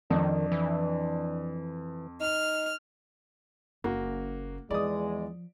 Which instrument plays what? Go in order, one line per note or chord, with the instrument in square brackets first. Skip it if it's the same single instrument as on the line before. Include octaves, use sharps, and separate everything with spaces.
[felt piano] F2 [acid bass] D#3 [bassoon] D4
[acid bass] E3
[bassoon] D#4 [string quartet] F6
[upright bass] F#1 [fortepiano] A#3 F#4
[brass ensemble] E2 G#3 [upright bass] F3 [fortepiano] D5 D#6